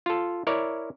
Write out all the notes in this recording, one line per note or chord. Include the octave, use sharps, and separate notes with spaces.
F4 A4
E4 A#4 C#5 D5